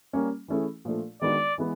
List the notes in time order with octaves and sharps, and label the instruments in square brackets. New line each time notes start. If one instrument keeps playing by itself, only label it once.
[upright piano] G3 A#3 C#4
E3 A3 C#4 E4 G#4
A#2 F3 A3 D4 F4
[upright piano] D#3 G#3 B3 D4 F#4 [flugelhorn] D5
[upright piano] E3 G#3 B3